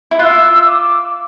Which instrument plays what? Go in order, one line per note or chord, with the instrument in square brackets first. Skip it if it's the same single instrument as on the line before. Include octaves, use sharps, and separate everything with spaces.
[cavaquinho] E4
[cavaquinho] F4 [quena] E6 F#6
[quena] D6